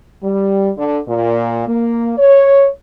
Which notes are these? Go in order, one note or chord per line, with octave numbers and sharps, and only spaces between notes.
G3
D3
A#2
A#3
C#5